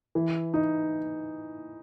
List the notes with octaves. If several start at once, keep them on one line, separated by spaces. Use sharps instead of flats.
E3
D#4